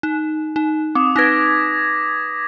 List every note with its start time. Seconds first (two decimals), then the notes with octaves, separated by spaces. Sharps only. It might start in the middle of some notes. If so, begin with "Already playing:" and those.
0.03 D#4
0.56 D#4
0.95 C4 D6 D#6
1.16 D#4 B4 G#6 A#6 B6